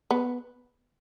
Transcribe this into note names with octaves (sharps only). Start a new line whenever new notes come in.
B3